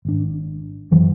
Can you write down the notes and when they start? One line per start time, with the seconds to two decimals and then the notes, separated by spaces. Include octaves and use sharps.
0.05 G#1 D4
0.91 F#2 E3 F#3